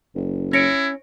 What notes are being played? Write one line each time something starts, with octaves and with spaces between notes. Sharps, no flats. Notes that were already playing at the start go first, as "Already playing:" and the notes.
F#1
C#4 E4 A#6 C#7 D7